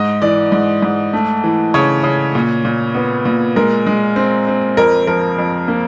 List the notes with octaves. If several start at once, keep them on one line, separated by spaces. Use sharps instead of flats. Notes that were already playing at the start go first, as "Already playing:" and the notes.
Already playing: G#2 D#5
E3 D5
G#2
G#2
A3
E3
C#3 C#5
C#3
A#2
A#2
B3
A#2
G#3 A#4
G#3
C4
C4
F2 A#4
F3 A#4
F2
A#3